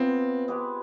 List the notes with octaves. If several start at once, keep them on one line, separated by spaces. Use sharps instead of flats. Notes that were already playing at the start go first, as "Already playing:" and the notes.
Already playing: G#3 B3 C4 F4
G#3 C4 G4 B4